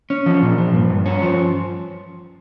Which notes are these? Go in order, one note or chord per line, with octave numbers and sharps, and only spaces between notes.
C#4
F3
A#2
F3
G2
G2
C#4
F3